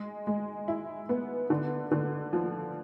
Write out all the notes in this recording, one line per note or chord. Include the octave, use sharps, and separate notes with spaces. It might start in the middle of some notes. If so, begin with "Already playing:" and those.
Already playing: G#3
G#3
E4
B3
D3
D3
F3